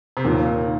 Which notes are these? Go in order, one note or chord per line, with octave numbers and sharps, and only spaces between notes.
C3
D#2 A#2